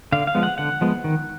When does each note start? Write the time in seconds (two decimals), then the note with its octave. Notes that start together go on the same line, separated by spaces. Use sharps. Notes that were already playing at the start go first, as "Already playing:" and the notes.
0.12 D3 F5
0.27 F5
0.35 F3 G#3 B3
0.43 F#5
0.58 D3 F#5
0.81 F3 G#3 B3
1.04 D#3